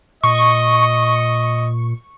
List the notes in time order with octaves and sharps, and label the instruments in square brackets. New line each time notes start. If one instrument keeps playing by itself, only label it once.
[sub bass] A#2 [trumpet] D#5 [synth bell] C#6